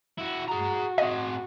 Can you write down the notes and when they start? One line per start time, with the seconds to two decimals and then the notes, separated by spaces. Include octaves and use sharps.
0.18 E4 F#4
0.48 F#4 G#4 A#5
0.98 C4 G#4 D#5